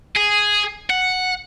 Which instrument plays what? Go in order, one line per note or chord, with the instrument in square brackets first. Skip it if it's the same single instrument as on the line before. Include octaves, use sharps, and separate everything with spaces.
[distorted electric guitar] G#4
F#5